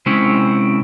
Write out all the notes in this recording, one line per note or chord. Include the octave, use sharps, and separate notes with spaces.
C3 G#3 C4 C#4 E4